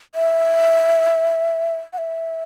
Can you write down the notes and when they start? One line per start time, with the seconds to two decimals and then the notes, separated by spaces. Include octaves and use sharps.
0.15 E5
1.93 F#5
1.98 E5